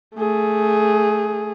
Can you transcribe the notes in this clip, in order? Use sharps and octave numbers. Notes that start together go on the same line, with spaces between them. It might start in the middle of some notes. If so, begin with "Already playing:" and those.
A3 G#4